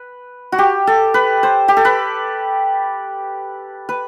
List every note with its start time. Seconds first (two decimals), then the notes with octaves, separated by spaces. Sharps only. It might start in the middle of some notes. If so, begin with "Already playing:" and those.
Already playing: B4
0.52 F#4
0.58 G4
0.87 A4
1.14 B4
1.43 C5
1.68 G4
1.77 A4
1.85 B4
3.89 B4